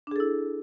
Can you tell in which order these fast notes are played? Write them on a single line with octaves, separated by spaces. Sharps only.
D4 G#4 A4 E4